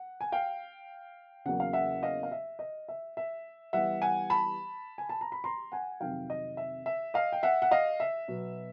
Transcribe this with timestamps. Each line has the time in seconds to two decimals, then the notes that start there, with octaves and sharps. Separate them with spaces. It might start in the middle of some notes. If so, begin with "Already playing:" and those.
Already playing: F#5
0.21 G#5
0.32 F5 G5
1.45 E2 C#3 F#3 A#3 F#5
1.60 F5
1.73 E5 F#5
2.03 D#5 F5
2.23 F5
2.32 E5
2.59 D#5
2.89 E5
3.17 E5
3.73 E3 G3 B3 E5 F#5
4.02 F#5 G#5
4.30 A5 B5
4.98 G#5
5.09 A5
5.21 A#5
5.32 B5
5.44 A#5 C6
5.72 F#5 G#5
6.00 F2 C3 D#3 F#3 F5 G5
6.30 D#5
6.57 E5
6.86 E5
7.14 D#5 F5
7.32 G5
7.43 E5 F#5
7.62 F#5
7.71 D#5 F5
8.00 E5
8.28 B2 F#3 B3